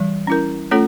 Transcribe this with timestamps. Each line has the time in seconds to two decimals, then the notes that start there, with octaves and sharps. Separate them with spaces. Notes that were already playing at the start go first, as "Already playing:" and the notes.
Already playing: E3 G3
0.27 C#4 E4 A#4
0.71 A3 C#4 F4 A4 C#5